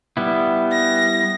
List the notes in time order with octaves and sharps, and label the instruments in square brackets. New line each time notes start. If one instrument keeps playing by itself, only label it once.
[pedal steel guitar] G3 B3 E4
[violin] A#6